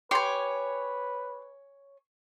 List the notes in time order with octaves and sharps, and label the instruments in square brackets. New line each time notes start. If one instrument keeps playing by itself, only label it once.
[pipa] G4 [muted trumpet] B4 [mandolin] C#5 G#5 [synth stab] C6